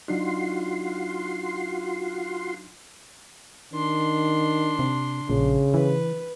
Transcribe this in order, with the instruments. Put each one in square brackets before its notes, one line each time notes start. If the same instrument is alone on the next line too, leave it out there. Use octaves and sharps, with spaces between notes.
[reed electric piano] F#3 D4 D#4 [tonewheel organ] F4 F#4 C6
[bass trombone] D#3 [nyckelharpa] D4 C6
[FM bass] C3
[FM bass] A#1 [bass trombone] C#3
[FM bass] E3 [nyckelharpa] B4